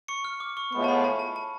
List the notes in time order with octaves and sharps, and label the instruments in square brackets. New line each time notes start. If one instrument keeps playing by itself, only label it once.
[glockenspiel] C#6 C#7
F6
D6
C#6
[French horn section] A2 F3 G#3 B3 [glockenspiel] C#6
[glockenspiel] A5
B5
A5
A5
A5